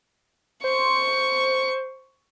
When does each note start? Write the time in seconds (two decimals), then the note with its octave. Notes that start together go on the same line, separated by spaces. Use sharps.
0.64 C5 C#6